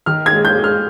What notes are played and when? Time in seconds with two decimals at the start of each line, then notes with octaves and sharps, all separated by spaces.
0.06 D#3 F6
0.26 G#6
0.32 G#3
0.45 G6
0.58 G#3
0.64 F6